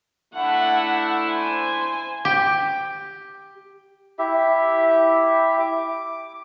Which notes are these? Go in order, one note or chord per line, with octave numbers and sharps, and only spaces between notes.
A3 D4 E4 F#5
C5 G#5
G4
E4 G4 E5
D6